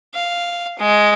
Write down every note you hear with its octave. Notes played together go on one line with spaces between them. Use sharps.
F5
G#3